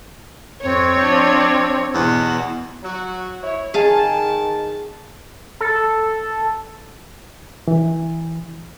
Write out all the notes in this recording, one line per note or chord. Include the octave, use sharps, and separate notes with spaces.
F2 C4 C#5
F3 D4
E2 B2 F#4
F#3 F#4
E4 C#5
D#3 G#4 F5 A5
A4
E3